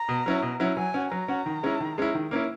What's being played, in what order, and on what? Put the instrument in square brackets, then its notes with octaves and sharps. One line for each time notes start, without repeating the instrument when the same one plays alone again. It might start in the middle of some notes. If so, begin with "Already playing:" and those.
Already playing: [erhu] A#5
[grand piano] B2
F#3 C#4 E4
B2
F#3 C#4 E4
[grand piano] F#3 [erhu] G#5
[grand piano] C#4 F#4
[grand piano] F#3 [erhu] A#5
[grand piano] C#4 F#4
D#3
G#3 C#4 E4
D#3
G#3 C#4 E4
D#3
A#3 C#4 E4